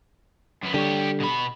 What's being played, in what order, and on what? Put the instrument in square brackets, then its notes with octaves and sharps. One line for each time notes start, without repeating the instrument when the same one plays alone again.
[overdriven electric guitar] F#2 B3
[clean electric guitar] D3 G3 [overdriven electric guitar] G4 C#5
[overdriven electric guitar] B2 B5